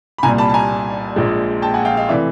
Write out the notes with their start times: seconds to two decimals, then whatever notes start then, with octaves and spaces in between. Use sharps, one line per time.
0.18 B5
0.23 C2 A#2 G3 G#5 A#5
0.38 A5 B5
0.49 A5
0.54 G#5 A#5
1.16 A#1 A#2 F3 G#3
1.62 G5 A5
1.74 F#5 G#5
1.85 F5 G5
1.97 D#5 F5
2.09 C3 E3 A3 D5 E5